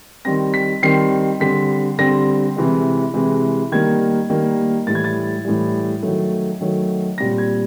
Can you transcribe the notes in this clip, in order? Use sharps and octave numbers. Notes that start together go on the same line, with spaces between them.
D#3 G3 C4 A#6
B6
D#3 G3 C4 C7
D3 G3 C4 B6
D3 G3 C4 A#6
C3 E3 G#3
C3 E3 G#3
D#3 G3 A#3 G#6
D#3 G3 A#3
A2 E3 G3 A6
G#6
A6
A2 E3 G3
D#3 F#3 A3
D#3 F#3 A3
A#2 G3 C4 A#6
G#6